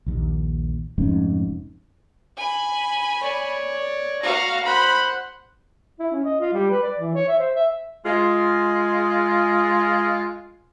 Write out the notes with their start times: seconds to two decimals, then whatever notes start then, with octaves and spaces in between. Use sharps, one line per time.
0.06 A#1 D#2
0.98 F1 F2 G#2 C#4
2.37 G#5 B5
3.21 C#5 D5
4.22 F#4 F5 A#5 C#6
4.65 C5 F#5 B5
6.00 E4
6.12 C#4
6.25 D#5
6.40 F4
6.53 G3
6.70 B4
6.83 D5
6.99 E3
7.15 C#5
7.28 E5
7.40 C5
7.56 E5
8.05 G#3 F4